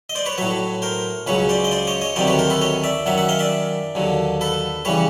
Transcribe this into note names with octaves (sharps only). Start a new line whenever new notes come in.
D#5
C5 D5
B4 C#5
A2 F#3 B4 C#5
A#4 C5
C#2 C#3 F#3 B4 C#5
C5 D5
D#5
C5 D5
C#5 D#5
C#5 D#5
D2 C3 D#3 F#3 C5 D5
B4 C#5
A#4 C5
A4 B4
C#5 D#5
D5 E5
F#2 D#3 F#3 E5 F#5
E5 F#5
D#5 F5
D5 E5
D#2 D3 F#3
A4 B4
C#3 E3 G3 B4 C#5